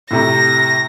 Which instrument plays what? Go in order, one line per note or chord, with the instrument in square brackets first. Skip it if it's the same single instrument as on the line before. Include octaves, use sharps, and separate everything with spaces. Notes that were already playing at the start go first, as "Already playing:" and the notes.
[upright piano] A2 C3 A#5 [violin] A#6